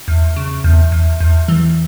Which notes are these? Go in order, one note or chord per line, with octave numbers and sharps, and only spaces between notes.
E2
C#3
E2
E2
E2
E3